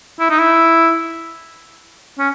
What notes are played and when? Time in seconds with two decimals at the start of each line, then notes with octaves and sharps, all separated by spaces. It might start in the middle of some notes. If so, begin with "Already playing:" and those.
0.20 E4
0.30 D#4
0.39 E4
2.19 C#4